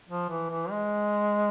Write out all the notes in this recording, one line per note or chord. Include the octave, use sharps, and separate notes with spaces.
F3
E3
E3
G#3